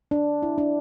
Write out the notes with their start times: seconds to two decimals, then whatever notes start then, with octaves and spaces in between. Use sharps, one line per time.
0.11 D4
0.43 E4
0.58 D4